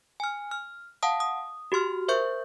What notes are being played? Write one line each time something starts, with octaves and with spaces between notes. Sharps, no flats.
G#5 F6
F6
F5 F#5 A5 D#6
D#6
F#4 G4 C6 F6
A#4 C5 E5 C#6 G6